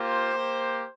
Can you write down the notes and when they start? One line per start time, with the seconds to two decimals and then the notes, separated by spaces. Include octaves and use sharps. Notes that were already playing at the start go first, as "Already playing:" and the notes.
Already playing: A#3 F4 G4 C5
0.34 A#3 G4